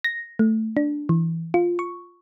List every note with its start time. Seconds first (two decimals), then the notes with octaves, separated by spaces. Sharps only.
0.04 A#6
0.39 A3
0.77 D4
1.09 E3
1.54 F4
1.79 C#6